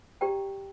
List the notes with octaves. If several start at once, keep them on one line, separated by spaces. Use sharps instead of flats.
G4 D5 G5 A#5